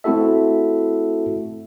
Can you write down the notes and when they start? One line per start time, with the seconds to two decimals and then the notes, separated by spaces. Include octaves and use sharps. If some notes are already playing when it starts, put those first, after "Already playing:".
0.04 A3 C4 E4 F#4 A4 E5